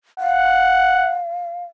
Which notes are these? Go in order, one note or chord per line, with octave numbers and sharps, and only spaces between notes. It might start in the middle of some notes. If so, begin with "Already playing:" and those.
F5 F#5